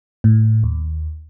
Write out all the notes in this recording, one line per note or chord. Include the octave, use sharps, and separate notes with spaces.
A2
D#2